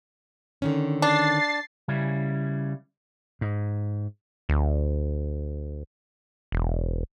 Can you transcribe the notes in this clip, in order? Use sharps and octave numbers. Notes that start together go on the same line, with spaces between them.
D3 D#3 C#4
D4 A6 C7
C#3 G3 C#4 E4
G#2
D2
E1